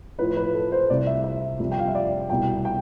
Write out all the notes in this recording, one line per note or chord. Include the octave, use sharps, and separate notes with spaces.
A2 F3 B4
B4
A4
C5
C2 C3 G3 D5
E5
E5
F2 C3 G3
G5
F5
E5
D5
C2 B2 G3 G5
G5